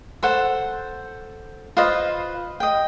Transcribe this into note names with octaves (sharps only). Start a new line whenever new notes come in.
A4 C5 F#5
F4 B4 C5 D#5
D#5 G5